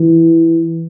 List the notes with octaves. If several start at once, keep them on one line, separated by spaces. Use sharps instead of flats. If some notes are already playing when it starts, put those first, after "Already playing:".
Already playing: E3